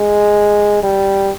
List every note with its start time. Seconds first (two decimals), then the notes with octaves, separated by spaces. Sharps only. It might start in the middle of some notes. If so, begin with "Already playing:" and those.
Already playing: G#3
0.83 G3